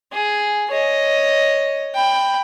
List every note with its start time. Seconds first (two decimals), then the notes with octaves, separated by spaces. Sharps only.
0.13 G#4
0.71 C#5 D#5
1.95 G5 B5